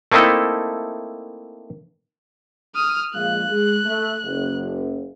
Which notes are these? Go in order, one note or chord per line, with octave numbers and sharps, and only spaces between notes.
A3 A#3 C4 D#4 E4 A4
D#6 F6
A#1 G#3 F5 F#6
G#3 G#4
A3
F#1